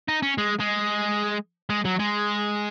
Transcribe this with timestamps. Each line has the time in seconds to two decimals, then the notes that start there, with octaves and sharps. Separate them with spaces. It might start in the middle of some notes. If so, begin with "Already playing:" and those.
0.08 D#4
0.23 C#4
0.38 G#3
0.60 G#3
1.70 G#3
1.85 F#3
1.99 G#3